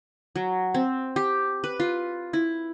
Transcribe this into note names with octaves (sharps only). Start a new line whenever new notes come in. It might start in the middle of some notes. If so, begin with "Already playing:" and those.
F#3
C4
G4
B4
F4
E4